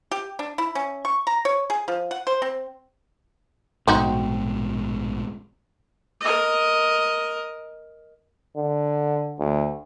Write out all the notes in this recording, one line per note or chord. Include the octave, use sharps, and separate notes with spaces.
G4
D4
E4
C#4
C#6
A#5
C#5
G#4
F3
F#5
C5
C4
A#1 G#2 B2 C4 D#4 F#4
A#4 D#5
D3
D2